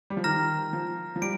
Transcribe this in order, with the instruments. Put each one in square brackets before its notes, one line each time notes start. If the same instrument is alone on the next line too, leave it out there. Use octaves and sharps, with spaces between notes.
[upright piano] G3
F3
[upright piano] D#3 [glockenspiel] A#5 F6 A#6
[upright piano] F3
F3
[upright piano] G3 [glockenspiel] D7